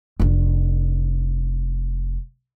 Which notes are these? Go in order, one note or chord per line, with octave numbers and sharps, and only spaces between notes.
F1 D4